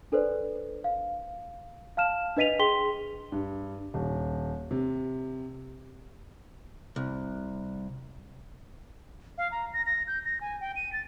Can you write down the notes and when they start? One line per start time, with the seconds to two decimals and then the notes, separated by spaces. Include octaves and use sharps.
0.12 D4 A4 B4 C5 D5
0.84 F5
1.97 F5 A5 F6 E7
2.37 D4 B4 D#5 B6 D#7 F7
2.59 G#4 G5 C6 B6 G7
3.32 G2
3.94 D#1
4.71 C3
6.96 C2
9.38 F5
9.52 A#5
9.74 A#6
9.86 A#6
10.08 G6
10.25 A#6
10.41 G#5
10.61 G5
10.76 D#7
10.93 A6